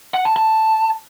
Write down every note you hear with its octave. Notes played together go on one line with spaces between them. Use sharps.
F#5
A5
A5